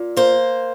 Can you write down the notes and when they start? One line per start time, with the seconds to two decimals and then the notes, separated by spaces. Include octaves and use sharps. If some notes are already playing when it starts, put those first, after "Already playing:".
Already playing: A#2
0.17 A#3 C5